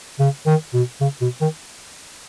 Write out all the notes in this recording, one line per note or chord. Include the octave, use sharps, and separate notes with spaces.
C#3
D#3
B2
C#3
B2
D#3